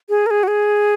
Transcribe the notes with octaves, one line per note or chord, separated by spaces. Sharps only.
G#4
A#4
G#4
F#4
G#4